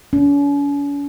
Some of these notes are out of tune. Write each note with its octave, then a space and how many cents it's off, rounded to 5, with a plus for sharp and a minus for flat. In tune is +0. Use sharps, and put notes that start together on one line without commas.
C#4 +45